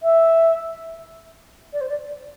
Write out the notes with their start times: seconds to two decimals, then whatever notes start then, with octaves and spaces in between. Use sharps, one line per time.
0.03 E5
1.73 D5
1.81 C5
1.89 D5